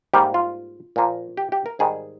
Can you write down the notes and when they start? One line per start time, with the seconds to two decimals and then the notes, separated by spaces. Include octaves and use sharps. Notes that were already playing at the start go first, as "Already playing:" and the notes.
0.14 G#2 G3 A#3 G4
0.34 F4
0.96 A#2 F3 A#3
1.37 G4
1.52 G4
1.66 A#4
1.79 G#2 D#3 G3 G#4